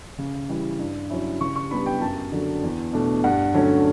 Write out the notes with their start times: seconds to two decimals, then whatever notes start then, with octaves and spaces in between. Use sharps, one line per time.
0.18 C#3
0.49 E3 G3
0.79 G2
1.10 F#3 C#4 E4
1.41 C#3 C#6
1.56 C#6
1.71 G3 B3 D4 B5
1.86 G5
2.01 F#2 A5
2.32 D3 F#3
2.63 E2
2.93 B2 A3 D4
3.24 G2 F#5
3.54 D3 F#3 A3 C#4